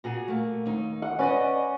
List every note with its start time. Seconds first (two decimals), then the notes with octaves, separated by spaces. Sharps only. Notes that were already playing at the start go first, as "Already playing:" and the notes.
0.04 A#2 F#4 G#4
0.28 A3 A#3
0.66 D#2 D#4
1.02 F#5
1.19 C#4 B4 D5 D#5